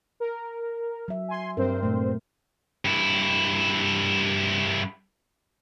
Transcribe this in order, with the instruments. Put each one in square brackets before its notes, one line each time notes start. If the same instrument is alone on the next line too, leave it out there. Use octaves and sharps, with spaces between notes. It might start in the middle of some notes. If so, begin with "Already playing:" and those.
[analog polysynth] A#4
[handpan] F#3 E5
[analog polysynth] G#5 C6
[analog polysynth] G2 C4 C5 [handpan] A#4
[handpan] A#2 A3
[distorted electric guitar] G2 E4